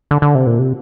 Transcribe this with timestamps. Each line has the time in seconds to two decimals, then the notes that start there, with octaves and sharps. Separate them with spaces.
0.11 D3
0.22 D3
0.35 C3
0.47 A#2
0.59 C3